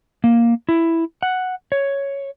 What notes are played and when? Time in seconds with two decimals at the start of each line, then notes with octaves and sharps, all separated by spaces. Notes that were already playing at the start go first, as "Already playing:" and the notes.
0.24 A#3
0.69 E4
1.23 F#5
1.72 C#5